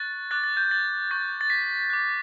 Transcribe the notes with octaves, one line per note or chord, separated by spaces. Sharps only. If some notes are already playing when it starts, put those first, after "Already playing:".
Already playing: C#6 F#6 A6
D6 F#6 A6
A6
G6
A6
C#6 G6 A6
A6
B6
D6 F#6